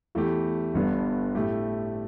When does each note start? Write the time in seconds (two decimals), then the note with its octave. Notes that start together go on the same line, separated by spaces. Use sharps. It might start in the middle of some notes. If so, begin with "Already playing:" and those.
0.15 E2 E3 A3 G4
0.74 G1 G2 D3 B3
1.35 A2 A3 G4